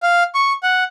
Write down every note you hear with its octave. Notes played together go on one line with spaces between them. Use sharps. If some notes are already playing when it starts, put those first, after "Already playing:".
F5
C#6
F#5